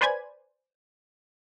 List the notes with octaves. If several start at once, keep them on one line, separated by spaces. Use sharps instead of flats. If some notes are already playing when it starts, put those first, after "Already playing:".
B4 C5 D5 G#5 B5 G#6